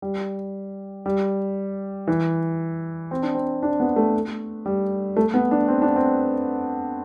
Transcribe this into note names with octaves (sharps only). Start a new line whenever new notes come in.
G3
G3
E3
C4
D4
C4
D4
B3
A3
G3
A3
B3
D4
C4
D4
C4